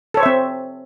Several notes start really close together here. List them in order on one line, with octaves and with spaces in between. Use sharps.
A4 C#5 C5 E5 C4